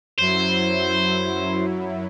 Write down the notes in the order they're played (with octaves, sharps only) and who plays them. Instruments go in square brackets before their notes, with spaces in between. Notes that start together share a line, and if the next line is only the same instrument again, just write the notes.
[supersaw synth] F#2 F#3 E4 [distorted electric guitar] C5